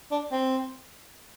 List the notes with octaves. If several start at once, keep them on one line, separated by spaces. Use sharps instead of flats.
D4
C4